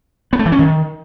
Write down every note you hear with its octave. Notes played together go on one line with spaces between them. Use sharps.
B3
A3
E3
C#4
D#3